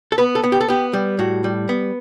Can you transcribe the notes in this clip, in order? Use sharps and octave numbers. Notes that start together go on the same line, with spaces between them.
A4
B3 B4
A4
B3
G4
A4
B3 G4
G3
A2 F#4
G3
B3